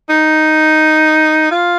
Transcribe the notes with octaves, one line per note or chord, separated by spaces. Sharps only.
D#4
F4